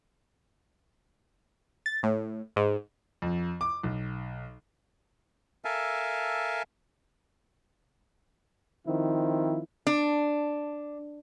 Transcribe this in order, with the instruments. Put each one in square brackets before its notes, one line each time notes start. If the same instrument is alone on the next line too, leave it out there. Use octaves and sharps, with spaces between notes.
[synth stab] A6
A2
G#2
[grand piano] F2
D6
B1
[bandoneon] A4 A#4 E5 F5 G#5 A5
[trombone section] D#3 F3 C4 E4
[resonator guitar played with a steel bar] D4